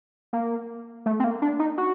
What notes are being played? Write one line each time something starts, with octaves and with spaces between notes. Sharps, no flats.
A#3
A3
C4
A#3
D4
D#4
F#4